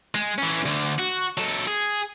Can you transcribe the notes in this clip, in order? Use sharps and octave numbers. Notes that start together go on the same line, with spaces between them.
G#3
E3 C#4
D2 D3
F#4
F#3 A4
G#4